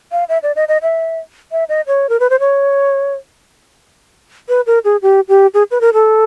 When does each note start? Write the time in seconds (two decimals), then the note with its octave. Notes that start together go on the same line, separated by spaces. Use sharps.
0.12 F5
0.29 E5
0.43 D5
0.56 D#5
0.68 D#5
0.82 E5
1.52 E5
1.69 D#5
1.87 C#5
2.09 A#4
2.20 B4
2.30 C5
2.40 C#5
4.49 B4
4.67 A#4
4.84 G#4
5.02 G4
5.29 G4
5.54 G#4
5.71 B4
5.81 A#4
5.93 A4